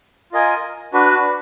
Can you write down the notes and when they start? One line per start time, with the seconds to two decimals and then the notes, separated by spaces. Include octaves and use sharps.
0.32 F4 A#4 D#5 G#5
0.93 D4 F#4 B4